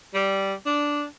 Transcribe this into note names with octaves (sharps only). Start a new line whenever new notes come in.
G3
D4